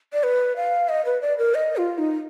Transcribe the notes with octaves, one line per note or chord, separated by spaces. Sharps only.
D5
B4
F5
D#5
B4
D5
A#4
D#5
F4
D#4